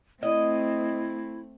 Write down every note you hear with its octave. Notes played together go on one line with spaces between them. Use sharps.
A3 C4 E4 D#5